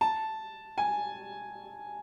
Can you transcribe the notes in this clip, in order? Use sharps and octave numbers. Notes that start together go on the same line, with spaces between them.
A5
G#5